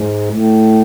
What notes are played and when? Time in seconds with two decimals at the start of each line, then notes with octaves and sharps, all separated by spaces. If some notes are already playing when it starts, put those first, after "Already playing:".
Already playing: G#2
0.31 A2